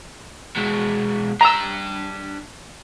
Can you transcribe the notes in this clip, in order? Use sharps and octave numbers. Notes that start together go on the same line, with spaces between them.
B2 G#3
D4 G5 A#5 E6